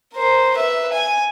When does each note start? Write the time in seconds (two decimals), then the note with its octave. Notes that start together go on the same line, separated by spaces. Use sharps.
0.14 A#4 C5
0.55 B4 E5
0.93 G#5